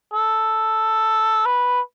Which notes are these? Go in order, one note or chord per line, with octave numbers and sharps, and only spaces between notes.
A4
B4